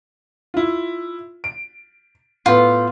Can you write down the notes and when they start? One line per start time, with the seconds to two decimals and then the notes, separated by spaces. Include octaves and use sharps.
0.54 E4 F4
1.44 D7
2.46 A2 B3 F4